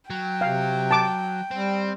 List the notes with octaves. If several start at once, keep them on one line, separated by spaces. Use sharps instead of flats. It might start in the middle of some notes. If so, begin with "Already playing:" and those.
F#3 G5
C3 F5
A5 D6
G3 C4